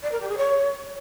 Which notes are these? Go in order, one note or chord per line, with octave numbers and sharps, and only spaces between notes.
D5
A#4
G4
G#4
C#5